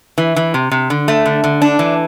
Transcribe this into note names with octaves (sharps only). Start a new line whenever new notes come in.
E3
E3
C3
C3
D3
A3
D3
D3
D4
E3